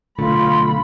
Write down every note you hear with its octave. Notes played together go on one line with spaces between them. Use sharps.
B1 D3 A3 F4 B5